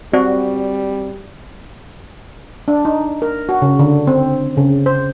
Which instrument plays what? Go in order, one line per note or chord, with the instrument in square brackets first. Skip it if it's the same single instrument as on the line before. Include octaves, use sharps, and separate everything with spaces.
[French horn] G3 [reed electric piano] C4 [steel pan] F#4 [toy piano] D5
[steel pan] D4
D#4
A#4
F#4
C#3
D3
C4
C#3
C5